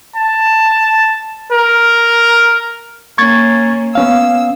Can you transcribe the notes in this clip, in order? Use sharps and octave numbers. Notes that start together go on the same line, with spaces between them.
A5
A#4
A#3 C#4 C#6 G#6 A6
B3 C#4 F5 E6